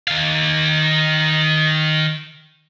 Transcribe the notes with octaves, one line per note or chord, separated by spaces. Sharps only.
D#3 F5